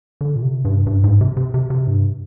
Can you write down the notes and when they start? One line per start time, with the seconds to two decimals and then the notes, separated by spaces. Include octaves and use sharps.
0.21 D3
0.36 A#2
0.43 C3
0.65 G2
0.87 G2
1.04 G#2
1.21 C3
1.37 C3
1.54 C3
1.70 C3
1.87 G2